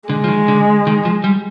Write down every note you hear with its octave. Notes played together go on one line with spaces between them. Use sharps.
D3 G#3
F3
D#3
D3
D#3
F3
G3